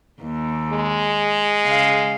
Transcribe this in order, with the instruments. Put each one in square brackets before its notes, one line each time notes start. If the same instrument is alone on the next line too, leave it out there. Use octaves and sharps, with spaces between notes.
[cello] D#2
[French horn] G#3
[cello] C#3 F5